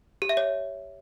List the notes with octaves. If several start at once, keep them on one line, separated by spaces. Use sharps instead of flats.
G4
E5
C#5